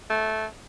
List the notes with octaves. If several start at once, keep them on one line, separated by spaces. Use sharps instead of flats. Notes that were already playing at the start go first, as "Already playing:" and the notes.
A3